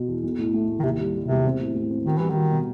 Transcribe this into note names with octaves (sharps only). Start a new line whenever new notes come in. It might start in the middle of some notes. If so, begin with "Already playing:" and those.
Already playing: B2
E2
B1
A2
A3
A2
D#3
D#2 C3
G3
G3
E1 C3
C4
A2
A2
C4
D#3 F#4
E3 G3
D#3 F#4
B2